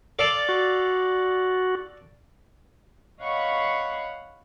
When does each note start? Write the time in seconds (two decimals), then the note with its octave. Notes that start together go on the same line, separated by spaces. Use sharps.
0.19 A4 D5 F5
0.49 F#4
3.22 C#5 D#5 F5 F#5 B5 C#6